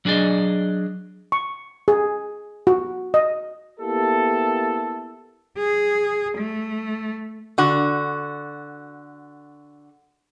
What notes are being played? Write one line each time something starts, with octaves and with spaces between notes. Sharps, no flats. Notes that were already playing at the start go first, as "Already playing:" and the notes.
F#3 D4 G#4 A#4 D5 D#5
C#6
G#4
F#4
D#5
A#3 B3 E4 G4 A4
G#4
A3
D3 F#4